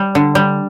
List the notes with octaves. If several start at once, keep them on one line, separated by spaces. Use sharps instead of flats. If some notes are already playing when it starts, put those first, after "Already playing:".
Already playing: G3
D3
G3